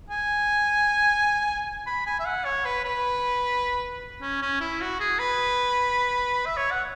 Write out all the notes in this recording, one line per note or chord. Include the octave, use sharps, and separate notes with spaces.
G#5
B5
G#5
E5
F#5
C#5
B4
B4
C#4
C#4
E4
F#4
G#4
B4
E5
C#5
F#5